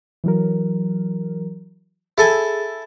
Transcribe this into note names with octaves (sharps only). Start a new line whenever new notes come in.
E3 F#3 A#4
E4 G#4 A4 G#5